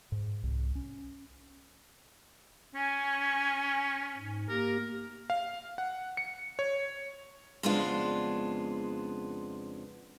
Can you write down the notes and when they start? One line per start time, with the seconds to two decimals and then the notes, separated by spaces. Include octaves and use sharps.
0.12 G#2
0.43 C2
0.75 C#4
2.75 C#4 G#5
4.18 G#2
4.49 A#3 G4 A#4
5.30 F5
5.78 F#5
6.17 C#7
6.59 C#5
7.63 F2 C#3 G#3 B3 D4 F4